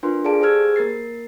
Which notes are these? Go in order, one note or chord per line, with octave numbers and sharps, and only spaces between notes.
D4 F4 A#4 B4 C6
G#4 A4 D5 F5 A5 D7
G4 G#4 C5 E6 F6 G#6
A#3 A#4 A6 C7